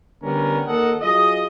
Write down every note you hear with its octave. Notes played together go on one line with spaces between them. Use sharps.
D3 G3 B3 C#4 A#4
D#2 A4 A#4 D#5 F#5
F#3 F4 G#4 D#5